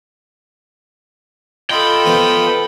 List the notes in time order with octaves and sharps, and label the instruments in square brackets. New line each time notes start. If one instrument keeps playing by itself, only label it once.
[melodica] F4 D#5 [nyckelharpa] A4 B5 [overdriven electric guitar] G5
[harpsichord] F3 B3